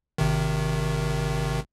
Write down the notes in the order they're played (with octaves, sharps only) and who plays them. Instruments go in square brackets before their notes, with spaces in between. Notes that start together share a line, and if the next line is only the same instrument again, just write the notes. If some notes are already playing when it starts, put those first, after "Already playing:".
[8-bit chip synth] G#1 C3 D#3